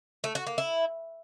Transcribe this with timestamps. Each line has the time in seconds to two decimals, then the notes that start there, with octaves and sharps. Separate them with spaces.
0.24 A3
0.35 F#4
0.47 A#3
0.58 E4